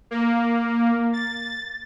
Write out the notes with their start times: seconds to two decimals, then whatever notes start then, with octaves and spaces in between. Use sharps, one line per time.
0.11 A#3
1.13 A6